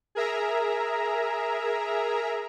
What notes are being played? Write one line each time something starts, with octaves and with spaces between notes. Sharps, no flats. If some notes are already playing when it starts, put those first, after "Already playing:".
G#4 A#4 E5 A#5